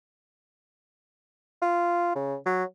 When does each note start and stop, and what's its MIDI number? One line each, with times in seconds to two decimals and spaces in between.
1.62 2.12 65
2.15 2.36 49
2.46 2.64 54